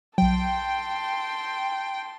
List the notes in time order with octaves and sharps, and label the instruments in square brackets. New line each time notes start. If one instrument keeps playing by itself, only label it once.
[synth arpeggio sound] B1 F#3 [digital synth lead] G5 [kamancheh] A5 C6